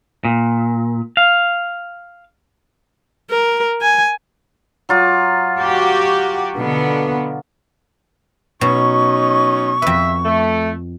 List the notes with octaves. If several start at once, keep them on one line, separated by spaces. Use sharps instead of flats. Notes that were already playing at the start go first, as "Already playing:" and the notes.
A#2
F5
A#4
G#5
F#3 F4 D6
F#4 G4
B2 D3 B3
B2 F#3 C#4 D#4 C#6
F2 B4 E5
A3